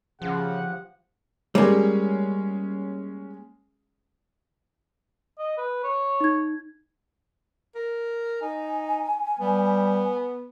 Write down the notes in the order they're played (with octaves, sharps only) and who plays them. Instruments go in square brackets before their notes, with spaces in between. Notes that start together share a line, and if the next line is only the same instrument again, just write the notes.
[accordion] C#3 [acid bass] F3 [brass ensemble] G4 F#5
[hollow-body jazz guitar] G3 A#3 [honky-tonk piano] G#3 C#4 G#4
[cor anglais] D#5
B4
C#5
[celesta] D#4 G#6
[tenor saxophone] A#4
[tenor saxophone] D#4 [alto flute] G#5
[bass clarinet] G3 [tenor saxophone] B3